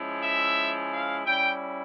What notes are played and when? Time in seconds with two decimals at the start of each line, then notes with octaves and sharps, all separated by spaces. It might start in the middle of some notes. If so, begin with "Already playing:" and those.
Already playing: F3 G#3 C#4 E4
0.22 E5
0.92 F5
1.26 G3 C#4 E4 G5